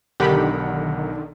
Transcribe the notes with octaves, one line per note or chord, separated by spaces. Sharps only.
B1 D3 D#3 G4 A#4 F#5 B5